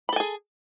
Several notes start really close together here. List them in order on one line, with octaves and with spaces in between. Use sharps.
B5 A4 G#5 G#4